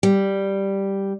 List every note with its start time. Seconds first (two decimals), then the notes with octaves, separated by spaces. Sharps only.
0.03 G3